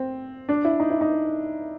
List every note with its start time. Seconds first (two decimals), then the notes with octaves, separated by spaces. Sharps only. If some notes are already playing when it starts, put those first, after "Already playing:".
Already playing: C4
0.49 D4
0.65 E4
0.80 D#4
0.90 E4
1.01 D#4